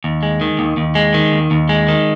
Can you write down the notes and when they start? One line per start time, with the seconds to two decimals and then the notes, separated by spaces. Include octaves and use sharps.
0.04 D#2
0.23 G#3
0.41 D#3
0.59 D#2
0.77 D#2
0.95 G#3
1.14 D#3
1.32 D#2
1.51 D#2
1.69 G#3
1.88 D#3